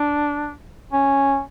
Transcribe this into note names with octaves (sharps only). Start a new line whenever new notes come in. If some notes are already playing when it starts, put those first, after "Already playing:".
Already playing: D4
C#4